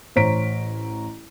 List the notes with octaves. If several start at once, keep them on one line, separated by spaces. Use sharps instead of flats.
A1 C5 C#5 A#5 B6 D7